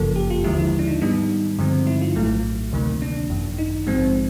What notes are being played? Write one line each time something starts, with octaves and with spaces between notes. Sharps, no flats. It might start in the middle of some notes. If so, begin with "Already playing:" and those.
Already playing: G1 F#2 C#3 F3 A#3 A4
G4
F4
D#2 D3 F3 G#3 E4
E4
D4
D#4
G#2 D#3 G3 B3 D#4
G2 D3 F3 G#3 C4
E4
F4
A#1 A2 F#3 A3
D2 C3 D#3 F#3 A#3
D4
G#1 F#2 D#3
D#4
A#1 G#2 F3 G#3 C4